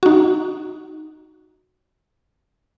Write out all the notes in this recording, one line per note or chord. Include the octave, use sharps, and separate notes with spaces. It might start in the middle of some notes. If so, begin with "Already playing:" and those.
D#4 F#4